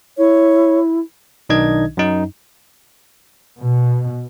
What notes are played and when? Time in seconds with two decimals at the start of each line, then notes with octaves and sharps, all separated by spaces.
0.18 E4 C#5
1.49 B1 D#3 D4 D#4 D#5 G#6
1.97 F#2 D#4
3.59 B2